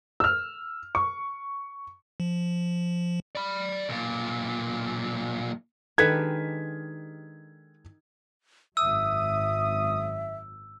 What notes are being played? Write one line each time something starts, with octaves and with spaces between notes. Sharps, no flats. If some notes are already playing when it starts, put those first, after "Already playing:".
E6 F6
C#6
F3
D5 B5
B1 A#2
D#3 G#3 D4 G4 A4 B4 G#6 B6
G#1 F#2 E5 D#6 E6